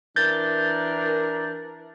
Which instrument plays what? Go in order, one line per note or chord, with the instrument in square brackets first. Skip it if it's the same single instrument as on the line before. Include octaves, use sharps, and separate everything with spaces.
[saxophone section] E3 D4 A#4 [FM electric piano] G6 A6